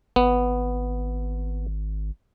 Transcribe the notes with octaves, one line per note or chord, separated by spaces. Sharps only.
G#1 B3